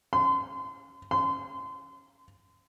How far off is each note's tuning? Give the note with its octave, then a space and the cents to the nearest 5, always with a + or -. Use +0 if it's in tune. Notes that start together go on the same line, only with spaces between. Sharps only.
C6 -35
C6 -30